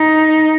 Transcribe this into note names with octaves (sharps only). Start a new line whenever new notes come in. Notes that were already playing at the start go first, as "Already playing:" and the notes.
Already playing: D#4